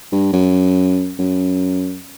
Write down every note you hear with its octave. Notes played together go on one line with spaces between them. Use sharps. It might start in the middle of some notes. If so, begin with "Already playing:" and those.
G2
F#2
F#2